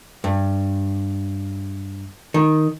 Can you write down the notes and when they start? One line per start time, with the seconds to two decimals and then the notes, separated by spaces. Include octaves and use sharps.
0.24 G2
2.34 D#3